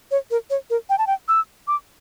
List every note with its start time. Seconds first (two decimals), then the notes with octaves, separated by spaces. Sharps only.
0.11 C#5
0.31 A#4
0.50 C#5
0.70 A#4
0.89 G5
0.98 A5
1.07 G5
1.28 E6
1.67 D6